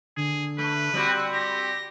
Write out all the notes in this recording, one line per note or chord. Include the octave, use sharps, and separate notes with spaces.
D3 G#4
A3 B4
G3 C4 F#4 F#6
G4 A#6